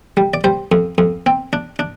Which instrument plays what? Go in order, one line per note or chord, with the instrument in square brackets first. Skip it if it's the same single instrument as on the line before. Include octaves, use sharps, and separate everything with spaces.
[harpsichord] G3
D5
G3 C5
F2
F2
C4
D4
D4